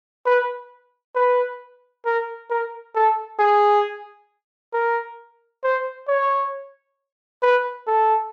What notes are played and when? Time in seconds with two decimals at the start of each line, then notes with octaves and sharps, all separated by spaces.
0.26 B4
1.16 B4
2.05 A#4
2.50 A#4
2.95 A4
3.39 G#4
4.74 A#4
5.64 C5
6.08 C#5
7.42 B4
7.88 A4